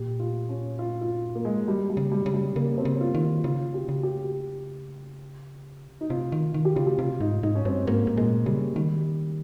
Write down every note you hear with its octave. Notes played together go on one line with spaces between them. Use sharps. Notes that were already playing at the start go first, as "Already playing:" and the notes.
Already playing: A#2 G4
F4
C#4
F4
F4
A#3
G#3
G3
G3
C#3
G3
C#3
G3
C#3 A#3
C4
C#3
F4
D#3
F4
C#3 F4
G4
C#3
G4
D#4
C3 F4
D#3
D#3
G4
C#3 F4
G4
C3 F4
G#2 D#4
G#2 D#4
C#4
G2 C4
G#2 A#3
G#2
A#2 G#3
C#3 G3
D#3 G3